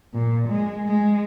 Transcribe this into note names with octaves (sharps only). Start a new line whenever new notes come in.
A#2
G#3
G#3